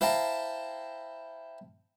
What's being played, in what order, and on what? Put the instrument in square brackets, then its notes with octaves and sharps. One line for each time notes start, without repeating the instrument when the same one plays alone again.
[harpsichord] E4 C5 F5 G5 A5 A#5